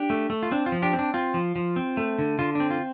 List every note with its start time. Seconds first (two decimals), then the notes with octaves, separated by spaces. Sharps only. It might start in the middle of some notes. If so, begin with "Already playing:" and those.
Already playing: D4 G4
0.10 A3
0.30 A3
0.43 F4
0.51 C4 D4
0.66 F4
0.72 F3
0.82 D4 G4
0.93 C4
0.99 D4
1.14 C4 F4
1.34 F3
1.56 F3
1.76 C4
1.97 A3
2.19 D3
2.39 D3 F4
2.55 C4 D4
2.71 F4